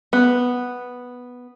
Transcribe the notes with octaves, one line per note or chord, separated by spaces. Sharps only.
B3